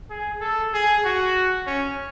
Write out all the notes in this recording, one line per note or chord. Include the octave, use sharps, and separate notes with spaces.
G#4
A4
G#4
F#4
C#4